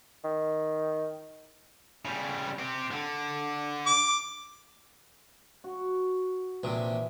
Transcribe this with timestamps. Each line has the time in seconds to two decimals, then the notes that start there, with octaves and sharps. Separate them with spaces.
0.24 D#3
2.05 C#3 G3
2.59 C4 G4
2.91 D3
3.86 D6
5.64 F#4
6.63 A#1 C3 E3